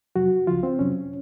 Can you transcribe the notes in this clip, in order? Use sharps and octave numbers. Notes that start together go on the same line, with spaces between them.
F2 C3 F#3 F#4
C#2 C#3 F3 F4
C4
F2 C3 F#3 C#4